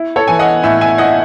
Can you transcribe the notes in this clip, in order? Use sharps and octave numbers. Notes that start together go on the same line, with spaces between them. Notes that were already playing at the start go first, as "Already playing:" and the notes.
Already playing: E4
A4 C#5
E3 G#5
D#5 F#5
A2 E5 G#5
E5 G#5
E4 D#5 F#5